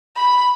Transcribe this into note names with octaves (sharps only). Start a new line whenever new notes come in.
B5